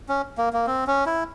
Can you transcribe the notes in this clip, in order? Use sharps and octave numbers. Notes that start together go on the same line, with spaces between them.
C#4
A#3
A#3
C4
C#4
E4